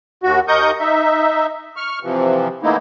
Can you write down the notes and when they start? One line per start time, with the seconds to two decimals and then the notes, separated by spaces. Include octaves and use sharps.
0.23 D#2 F#4
0.48 D#2 A#4 D#5 C#6 D#6 G6
0.80 D#4 E5
1.77 C#6 F6
2.03 C3 E3 F3
2.63 D3 E3 A3 A#3 D#4 E4